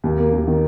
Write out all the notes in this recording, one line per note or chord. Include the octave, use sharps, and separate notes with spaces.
D#2
A#3
D#2
D#3